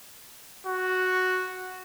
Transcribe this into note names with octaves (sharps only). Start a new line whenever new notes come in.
F#4